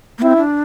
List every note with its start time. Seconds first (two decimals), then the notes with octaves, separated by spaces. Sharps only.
0.18 A#3
0.22 C4 E4
0.37 D4